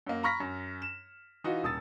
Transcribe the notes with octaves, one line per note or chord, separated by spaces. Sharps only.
F#2 A#3
A#5 B5 C#6 F6 A#6 B6
F#2
E7
E3 D#4 F4 F#4
D#1 D#6 E6 A6